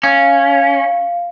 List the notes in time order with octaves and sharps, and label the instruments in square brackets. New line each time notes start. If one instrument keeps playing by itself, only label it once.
[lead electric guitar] C#4 [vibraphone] F5